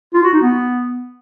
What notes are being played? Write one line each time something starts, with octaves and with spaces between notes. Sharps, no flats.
F4
F#4
D#4
B3